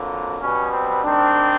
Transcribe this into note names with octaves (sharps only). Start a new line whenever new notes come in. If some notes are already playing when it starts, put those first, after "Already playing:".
Already playing: F2 D3 F#3 A#3
B2 G3 B3 C#4
C4
G#2 D#3 G3 C4 D4